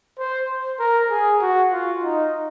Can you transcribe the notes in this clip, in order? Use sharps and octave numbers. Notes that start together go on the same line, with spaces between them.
C5
A#4
G#4
F#4
F4
D#4